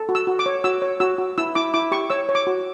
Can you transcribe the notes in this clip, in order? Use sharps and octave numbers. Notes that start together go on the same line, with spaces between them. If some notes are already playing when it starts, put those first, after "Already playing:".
Already playing: A4
F#4
E6
F#4
D6
C#5
F#4 E6
C#5
F#4 E6
F#4
E4 E6
E4 D6
E4 D6
G4 C#6
C#5 E6
C#5
D6
F#4